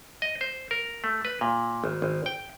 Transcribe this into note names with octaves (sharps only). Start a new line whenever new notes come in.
D#5
C5
A#4
A3
B4
A#2
G#1
G#1
G5